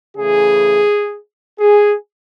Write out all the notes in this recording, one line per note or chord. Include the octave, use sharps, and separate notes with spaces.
C#3 E3 A3 G#4
G#4